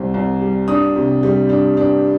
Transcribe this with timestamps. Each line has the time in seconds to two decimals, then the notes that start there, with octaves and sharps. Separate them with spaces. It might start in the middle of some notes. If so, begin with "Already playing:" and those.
Already playing: C2 G3 C4
0.14 C2
0.41 G3
0.68 D4 D#6
0.96 C3
1.23 G3
1.49 D4
1.77 D4